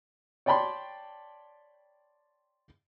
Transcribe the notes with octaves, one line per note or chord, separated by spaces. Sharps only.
C#5 D5 G5 A5 B5 C6